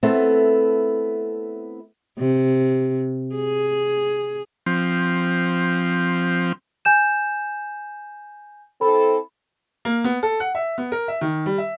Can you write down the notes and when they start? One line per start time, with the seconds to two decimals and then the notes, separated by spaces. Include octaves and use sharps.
0.03 A3 B3 C4 E4 A4
2.18 C3
3.35 G#4
4.66 F3 C4
6.85 G#5 G6 E7
8.81 C4 E4 A4 B5
9.85 A#3
10.04 B3
10.23 A4
10.40 F#5
10.55 E5
10.78 B3
10.92 A#4
11.08 E5
11.21 D#3
11.46 G3
11.58 E5